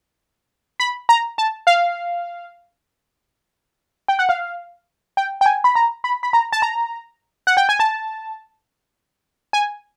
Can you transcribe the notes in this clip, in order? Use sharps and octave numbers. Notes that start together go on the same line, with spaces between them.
B5
A#5
A5
F5
G5
F#5
F5
G5
G5
G#5
B5
A#5
B5
B5
A#5
A5
A#5
F#5
G5
G#5
A5
G#5